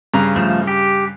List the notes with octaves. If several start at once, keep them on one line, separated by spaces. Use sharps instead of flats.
G2 C#3 A#5
F3 A3
G4